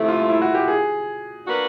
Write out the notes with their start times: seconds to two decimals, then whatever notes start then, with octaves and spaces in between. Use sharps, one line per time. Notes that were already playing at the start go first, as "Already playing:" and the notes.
Already playing: C3 F3 A3 E4
0.08 F4
0.20 F4
0.29 E4
0.42 F#4
0.55 G4
0.68 G#4
1.46 A#3 D4 F#4 B4